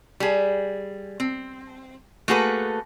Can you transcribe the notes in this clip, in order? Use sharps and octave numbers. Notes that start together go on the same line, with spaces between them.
G3 G#4
C4
A3 A#3 F#4 G#4 A4 B4